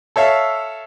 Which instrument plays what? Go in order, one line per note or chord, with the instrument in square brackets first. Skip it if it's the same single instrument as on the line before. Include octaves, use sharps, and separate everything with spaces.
[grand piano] A4 C#5 E5 F5